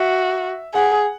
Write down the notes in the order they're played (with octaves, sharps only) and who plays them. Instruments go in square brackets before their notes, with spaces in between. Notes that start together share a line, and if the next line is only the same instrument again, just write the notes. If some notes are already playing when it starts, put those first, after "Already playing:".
Already playing: [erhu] F#4 [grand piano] E5
[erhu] G#4 [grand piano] F#5